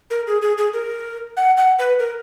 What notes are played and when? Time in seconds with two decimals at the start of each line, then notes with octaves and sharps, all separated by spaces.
0.10 A#4
0.27 G#4
0.42 G#4
0.58 G#4
0.74 A#4
1.37 F#5
1.57 F#5
1.79 B4
1.99 A#4